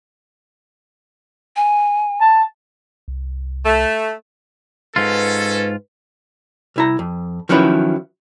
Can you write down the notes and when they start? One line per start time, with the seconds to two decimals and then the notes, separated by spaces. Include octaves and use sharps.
1.56 G#5
2.21 A5
3.08 C2
3.66 A3
4.96 G#2 C#4 F4 A4 B4
6.76 C2 E4 A#5
6.99 F2
7.49 D#3 F3 F#3 C#4 E4 B4